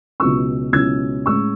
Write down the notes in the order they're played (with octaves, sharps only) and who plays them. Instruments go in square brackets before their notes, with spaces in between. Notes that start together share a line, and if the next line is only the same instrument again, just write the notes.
[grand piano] C#2 B2 F#3 C#4 E4 C#6 E6
C#2 B2 F#3 C#4 E4 E6 G#6
A2 G#3 C#4 C#6 E6